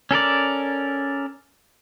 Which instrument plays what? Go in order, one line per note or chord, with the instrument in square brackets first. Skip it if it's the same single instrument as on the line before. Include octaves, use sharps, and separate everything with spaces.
[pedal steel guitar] C#4 A4 A#4 D5